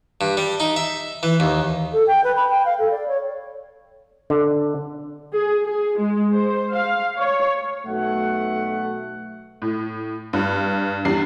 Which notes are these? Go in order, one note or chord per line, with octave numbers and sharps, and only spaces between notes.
G2
G3
D#4
E5
E3
D#2
A4
G5
B4
B5
G5
F5
A4
D5
C#5
D3
G#4
G#4
G#3
C5
F5
C#5
B1 A3 F#4 F#5
A2
G2
E2 G3 D4 C7